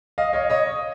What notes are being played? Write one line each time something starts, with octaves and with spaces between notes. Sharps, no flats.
D#5 F5
C#5 D#5
C#5 D#5